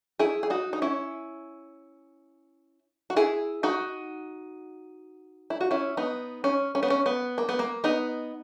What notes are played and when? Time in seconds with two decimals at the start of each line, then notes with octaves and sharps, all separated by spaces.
0.19 E4 G#4
0.43 G#4
0.50 D#4 F#4
0.73 D#4
0.82 C#4 E4
3.10 F#4
3.16 E4 G#4
3.63 D#4 F#4
5.50 E4
5.61 F#4
5.71 C#4 E4
5.97 B3 D#4
6.44 C#4
6.75 C#4
6.83 B3
6.90 C#4
7.06 B3
7.38 A#3
7.49 B3
7.59 A#3
7.84 B3 D#4